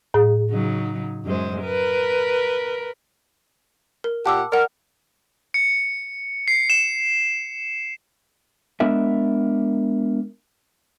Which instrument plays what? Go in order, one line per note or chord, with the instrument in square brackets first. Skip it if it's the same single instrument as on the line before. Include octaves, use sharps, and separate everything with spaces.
[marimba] A2 G#4
[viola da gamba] C#3 F#3 D#4
F#2 G#3 C5
A#4 B4
[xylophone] A#4
[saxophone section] A#2 G4 F#5 [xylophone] A5 D6 E6
[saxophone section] A#4 [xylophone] D5 F#5
[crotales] C#7
C7
E7
[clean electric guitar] G#3 B3 D4 A#4 E5